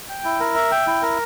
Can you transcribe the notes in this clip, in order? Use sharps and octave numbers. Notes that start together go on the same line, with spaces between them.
G5
E4
A#4
E5
G5
E4
A#4